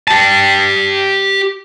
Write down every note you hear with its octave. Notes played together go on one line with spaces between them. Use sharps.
G4 A5